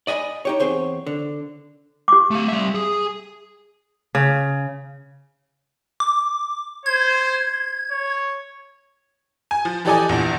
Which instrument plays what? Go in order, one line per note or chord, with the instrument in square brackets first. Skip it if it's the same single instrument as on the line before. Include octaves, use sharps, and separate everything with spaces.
[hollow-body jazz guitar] D5 D#5 G#5 B5
D#4 G4 C#5
E2 C4 G#4 C5 C#5
D3
[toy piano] G4 D6
[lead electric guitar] A3 F5
G3 E5
G#4
[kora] C#3
[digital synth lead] D6
[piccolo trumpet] C5 [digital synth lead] G#6
[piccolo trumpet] C#5
[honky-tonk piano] G#5
F3
E3 G4 A4 D5 D#5 G#5
A#1 E2